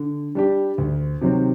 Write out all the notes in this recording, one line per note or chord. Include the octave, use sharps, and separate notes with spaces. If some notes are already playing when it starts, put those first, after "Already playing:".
Already playing: D3
G3 D4 G4
D2
C3 D#3 F#3 C4